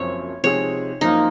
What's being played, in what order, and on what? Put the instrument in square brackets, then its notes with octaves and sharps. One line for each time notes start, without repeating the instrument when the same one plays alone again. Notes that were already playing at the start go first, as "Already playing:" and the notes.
Already playing: [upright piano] F#1 F#2 F3 C4 [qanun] C#5
[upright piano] C3 F3 G#3 D#4 G#4 [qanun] C#5
[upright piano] F#2 F3 A#3 F4 [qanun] D#4